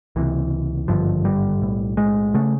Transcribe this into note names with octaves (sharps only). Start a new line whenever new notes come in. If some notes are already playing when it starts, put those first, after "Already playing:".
C#2 C3 E3
G#1 G2 D3 F3
G3
B1 A2
G#3
C#3 A3